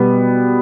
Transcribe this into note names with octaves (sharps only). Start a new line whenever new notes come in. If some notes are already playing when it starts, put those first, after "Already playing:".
Already playing: B2 G3 B3